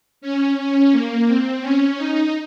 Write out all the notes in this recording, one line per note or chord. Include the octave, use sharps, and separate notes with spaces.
C#4
C#4
A#3
C4
C#4
D#4